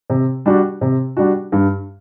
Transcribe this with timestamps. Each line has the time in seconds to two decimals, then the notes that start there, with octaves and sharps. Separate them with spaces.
0.10 C3
0.46 G3 D4 F#4
0.81 C3
1.17 G3 D4 F#4
1.52 G2